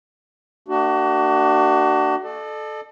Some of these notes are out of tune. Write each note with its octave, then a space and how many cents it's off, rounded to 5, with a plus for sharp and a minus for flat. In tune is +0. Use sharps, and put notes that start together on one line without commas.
A#3 -40 D4 +20 F#4 +35
A4 -15 D5 +45